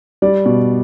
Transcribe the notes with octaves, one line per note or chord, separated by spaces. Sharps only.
G3 D5
B2